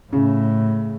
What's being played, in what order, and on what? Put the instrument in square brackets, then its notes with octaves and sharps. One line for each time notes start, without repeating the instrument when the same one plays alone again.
[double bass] A2 [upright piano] C#3